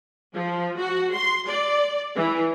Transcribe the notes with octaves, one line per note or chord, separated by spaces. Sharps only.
F3
F#4
C6
D5
E3